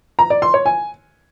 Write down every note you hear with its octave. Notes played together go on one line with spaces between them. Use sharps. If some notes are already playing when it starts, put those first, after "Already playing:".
A#5
D5
C6
C#5
G#5